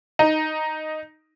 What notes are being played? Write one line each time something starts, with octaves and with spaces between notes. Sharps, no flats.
D#4